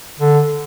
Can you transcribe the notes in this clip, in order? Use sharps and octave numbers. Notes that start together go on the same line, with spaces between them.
D3